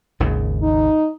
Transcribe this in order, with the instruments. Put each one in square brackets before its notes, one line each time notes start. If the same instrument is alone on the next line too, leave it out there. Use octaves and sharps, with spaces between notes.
[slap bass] G#1 D#2 C#3
[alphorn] D#4